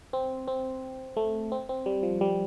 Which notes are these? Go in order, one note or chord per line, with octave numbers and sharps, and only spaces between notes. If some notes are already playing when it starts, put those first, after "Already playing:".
C4
C4
A3
C4
C4
G3
F3
G3